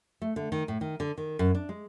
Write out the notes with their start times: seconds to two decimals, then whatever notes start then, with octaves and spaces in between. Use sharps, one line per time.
0.22 A3
0.36 D3
0.52 D#3
0.68 A2
0.81 D#3
1.00 D3
1.18 D#3
1.39 F#2
1.55 D4
1.69 G#3